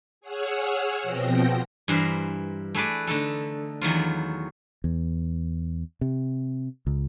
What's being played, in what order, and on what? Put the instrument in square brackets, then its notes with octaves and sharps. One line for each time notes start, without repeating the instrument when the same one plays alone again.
[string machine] G#4 C#5 F#5 E6 F6
B2 F3 B3 C4 G5 A#6
[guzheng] G2 E3 A#4 C5
A3 G#4 B4 D5
D3 A3 D#4 A4
E2 D#3 F#3 F4
[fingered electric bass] E2
C3
C#2